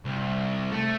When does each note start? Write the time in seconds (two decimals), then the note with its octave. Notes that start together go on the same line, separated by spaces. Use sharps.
0.05 C2
0.71 A3